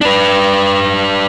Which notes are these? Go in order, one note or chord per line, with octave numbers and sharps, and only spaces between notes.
D4 B4